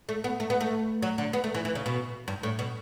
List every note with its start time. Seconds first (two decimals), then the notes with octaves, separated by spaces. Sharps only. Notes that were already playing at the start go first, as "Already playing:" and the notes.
0.09 A3
0.24 B3
0.40 A3
0.50 B3
0.61 A3
1.02 F#3
1.18 D3
1.33 B3
1.44 A3
1.55 E3
1.65 E3
1.75 C#3
1.86 B2
2.28 G2
2.43 A2
2.59 B2